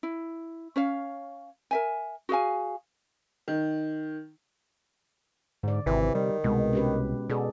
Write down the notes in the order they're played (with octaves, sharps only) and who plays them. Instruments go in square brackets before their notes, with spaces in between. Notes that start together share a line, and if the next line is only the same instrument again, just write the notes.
[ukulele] E4
C#4 C#5 F5
A#4 E5 G#5
F#4 G#4 F5 G#5
[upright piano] D#3
[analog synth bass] G#2 [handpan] D3 D5
[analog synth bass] G#1 [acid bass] C3 [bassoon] E3
[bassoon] D#3 [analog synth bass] G3
[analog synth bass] C2 [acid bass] B2 [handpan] G#3
[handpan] C#4 G4 B4
[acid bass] B2 [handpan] G#4 A4 D5